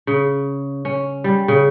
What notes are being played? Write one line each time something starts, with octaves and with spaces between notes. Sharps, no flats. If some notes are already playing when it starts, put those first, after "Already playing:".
C#3
C#4
G3
C#3